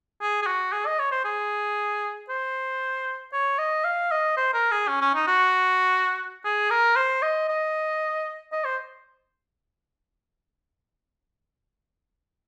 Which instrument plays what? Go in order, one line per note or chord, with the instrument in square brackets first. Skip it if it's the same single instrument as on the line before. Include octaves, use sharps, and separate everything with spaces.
[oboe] G#4
G#4
F#4
G#4
D#5
C#5
C5
G#4
C5
C#5
D#5
F5
D#5
C5
A#4
G#4
C#4
C#4
D#4
F#4
G#4
A#4
C5
D#5
D#5
D#5
C5